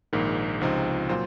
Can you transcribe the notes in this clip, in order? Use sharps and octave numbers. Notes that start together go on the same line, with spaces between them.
A#1 G#2 D#3 A#3
C#2 C3 F3 C4 D#4
A#2 F#3 F4 C5